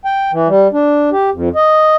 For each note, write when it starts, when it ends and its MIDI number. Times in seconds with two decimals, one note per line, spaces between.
0.05 0.31 79
0.33 0.48 52
0.48 0.68 55
0.73 1.10 62
1.12 1.30 67
1.33 1.49 41
1.56 1.96 75